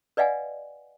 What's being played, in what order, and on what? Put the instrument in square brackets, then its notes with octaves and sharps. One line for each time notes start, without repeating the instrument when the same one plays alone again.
[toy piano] B4 D5 D#5 F5 F#5 G#5